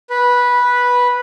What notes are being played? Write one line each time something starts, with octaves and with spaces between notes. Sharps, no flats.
B4